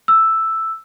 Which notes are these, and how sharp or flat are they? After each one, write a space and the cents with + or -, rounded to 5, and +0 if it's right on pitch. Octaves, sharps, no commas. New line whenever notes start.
E6 +0